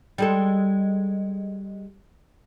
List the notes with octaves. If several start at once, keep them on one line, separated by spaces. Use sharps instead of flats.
G3 G#3 A4